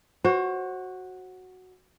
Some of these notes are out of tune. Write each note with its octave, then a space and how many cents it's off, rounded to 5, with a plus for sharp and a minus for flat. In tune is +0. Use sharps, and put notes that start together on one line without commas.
F#4 +0 C5 +35